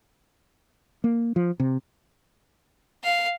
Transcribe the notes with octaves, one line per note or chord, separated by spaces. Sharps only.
A#3
F3
C3
F5